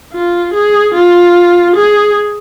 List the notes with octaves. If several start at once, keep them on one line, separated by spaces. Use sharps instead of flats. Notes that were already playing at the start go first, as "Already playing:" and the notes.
F4
G#4
F4
G#4